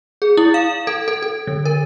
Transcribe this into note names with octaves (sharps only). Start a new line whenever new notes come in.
G#4
E4
F5
A4
A4
A4
D3
A#4